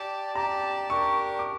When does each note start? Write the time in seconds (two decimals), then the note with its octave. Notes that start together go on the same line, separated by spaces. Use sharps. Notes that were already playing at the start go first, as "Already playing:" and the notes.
Already playing: G4 D5 A5
0.35 G4 D5 A5 A#5
0.90 D4 G4 A#4 C#6
1.39 D6